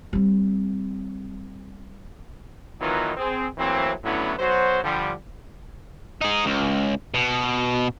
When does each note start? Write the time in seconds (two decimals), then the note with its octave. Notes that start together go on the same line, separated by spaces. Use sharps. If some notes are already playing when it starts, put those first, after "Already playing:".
0.13 G3 C4
2.80 D#3 E3 F#3 B3 D#4 F4
3.16 C4 G#4
3.58 E3 F#3 A3 A#3 C4
4.04 A2 D3 F#3 B3 C#4 E4
4.38 B1 F#3 F#4 C5
4.83 D3 F3 G3
6.21 D#4 G#4
6.46 C#2
7.14 B2